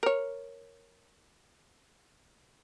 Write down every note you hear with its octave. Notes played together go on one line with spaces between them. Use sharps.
A#4 C#5